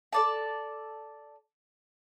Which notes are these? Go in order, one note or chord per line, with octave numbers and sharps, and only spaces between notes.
A4 D5 A5